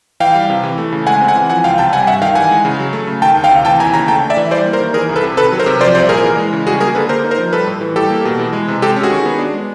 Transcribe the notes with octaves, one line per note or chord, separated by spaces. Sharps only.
E3 F5 G5
G3
C3
E3
A3
C#3
G#3 F#5 G#5
C4
F#5 G#5
E3
F3 F#5 G#5
C#2 F5 G5
C3 G5 A5
G3 F#5 G#5
G2 E5 F#5
D#3 F5 G5
E3 F#5 G#5
G#3
C#3
F#3
A3
C#3
D#3 G5 A5
D2
F5 G5
C3
E3 G5 A5
D#2 G#5 A#5
C#3 G#5 A#5
A3 G5 A5
D4
D5 E5
E3
G3 C5 D5
A#3
A#4 C5
D#3
E3 G#4 A#4
C2
A4 B4
C3
D#3 A4 B4
F#3
A#4 C5
C3
F3 C5 D5
C2 C5 D5
A#2 G#4 A#4
E3
G#3
C#3
G3 F#4 G#4
A#3 G#4 A#4
D3 A4 B4
A#3 A#4 C5
D#4
A#4 C5
F3
G3 A4 B4
A2
E3
G3 G4 A4
A#3
B2
E3
G#3
C3
G#3 G4 A4
C#4
F#4 G#4
D#3
B3
D4
G#3